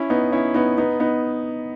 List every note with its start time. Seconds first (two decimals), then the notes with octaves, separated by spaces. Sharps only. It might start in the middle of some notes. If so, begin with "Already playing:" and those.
Already playing: C#4 E4
0.10 B3 D#4
0.32 C#4 E4
0.54 B3 D#4
0.78 B3 D#4
1.00 B3 D#4